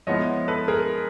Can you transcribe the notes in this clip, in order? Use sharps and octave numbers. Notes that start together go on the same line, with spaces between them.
F3 G#3 B3 E4 C#5 D#5
A4 B4
G#4 A#4